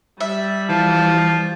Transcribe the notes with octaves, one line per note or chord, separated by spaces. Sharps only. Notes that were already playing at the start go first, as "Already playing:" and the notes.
G3 E5
E3 F3